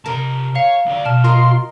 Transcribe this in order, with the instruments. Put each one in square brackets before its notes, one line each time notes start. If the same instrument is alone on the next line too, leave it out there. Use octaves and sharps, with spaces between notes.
[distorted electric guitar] C3 A5 [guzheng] A#4
[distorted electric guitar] C#5 [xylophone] F5
[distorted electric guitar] D2 D5
[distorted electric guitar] B1 [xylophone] A5 F6
[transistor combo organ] F4 C6 [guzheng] A#4 D#5